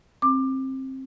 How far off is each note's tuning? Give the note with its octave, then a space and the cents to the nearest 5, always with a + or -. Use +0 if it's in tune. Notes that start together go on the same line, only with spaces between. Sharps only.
C4 +20 D6 +20